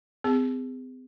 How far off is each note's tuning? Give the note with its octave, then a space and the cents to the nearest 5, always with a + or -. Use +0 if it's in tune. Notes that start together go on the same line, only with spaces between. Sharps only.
C4 -45 G#4 -25